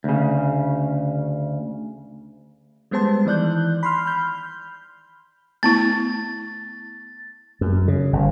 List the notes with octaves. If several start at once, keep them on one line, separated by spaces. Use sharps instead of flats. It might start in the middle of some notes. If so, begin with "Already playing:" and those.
D2 C#3
G3 G#3 B3 C5 A5 C6
D#3 E3 D5 F#6 G6
B5 C6 F6
B5 F6 G6
A3 B3 E4 A6
F#2
C#3
G1